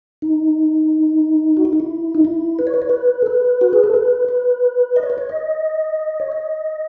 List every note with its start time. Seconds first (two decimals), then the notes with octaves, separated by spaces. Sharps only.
0.22 D#4
1.57 F#4
1.65 E4
1.73 D#4
1.80 E4
2.15 D#4
2.25 E4
2.59 B4
2.67 C#5
2.74 B4
2.82 C#5
2.89 B4
3.22 A4
3.26 B4
3.61 F#4
3.73 G#4
3.84 A4
3.94 B4
4.28 B4
4.96 D#5
5.03 C#5
5.10 B4
5.18 C#5
5.29 D#5
6.20 C#5
6.32 D#5